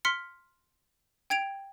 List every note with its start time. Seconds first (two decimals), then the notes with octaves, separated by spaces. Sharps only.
0.05 C6 F6 B6 C#7
1.30 G5 G#6 D7 F7